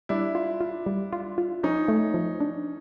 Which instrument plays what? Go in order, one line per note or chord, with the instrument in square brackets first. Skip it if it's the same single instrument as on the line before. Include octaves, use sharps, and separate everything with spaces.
[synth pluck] G3 [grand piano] D4 E4
[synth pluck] F4
F4
G3
F4
F4
[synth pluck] F3 [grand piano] C#4 D#4
[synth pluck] A3
F3
D4